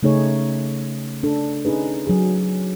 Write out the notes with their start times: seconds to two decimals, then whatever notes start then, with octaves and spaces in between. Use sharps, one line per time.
0.03 C#3 A3 D#4 G#4 C#5
1.23 D4 A4
1.65 C#4 D#4 G#4 B4
2.07 F#3 G#4